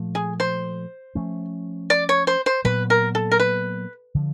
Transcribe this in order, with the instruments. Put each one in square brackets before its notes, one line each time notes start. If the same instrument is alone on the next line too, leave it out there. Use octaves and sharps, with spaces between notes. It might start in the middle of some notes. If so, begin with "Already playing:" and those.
Already playing: [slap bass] A#2 F3 A3
[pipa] G#4
C5
[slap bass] F3 A3 C#4
[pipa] D5
C#5
C5
C5
[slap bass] A#2 F#3 B3 [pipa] B4
[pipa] A#4
A4
A#4
B4
[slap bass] D3 F3